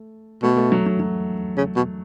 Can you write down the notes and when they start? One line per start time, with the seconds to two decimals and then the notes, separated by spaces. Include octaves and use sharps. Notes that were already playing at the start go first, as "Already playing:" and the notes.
Already playing: A3
0.43 B2 A3
0.57 A3
0.72 F#3
0.86 F#3
1.00 F#3
1.57 C#3
1.76 B2